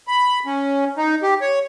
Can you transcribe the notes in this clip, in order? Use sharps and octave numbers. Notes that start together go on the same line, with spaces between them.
B5
C#4
D#4
G4
C#5